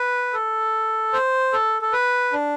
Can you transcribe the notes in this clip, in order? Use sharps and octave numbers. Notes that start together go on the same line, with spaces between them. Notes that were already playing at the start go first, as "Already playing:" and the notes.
Already playing: B4
A4
C5
A4
A4
B4
D4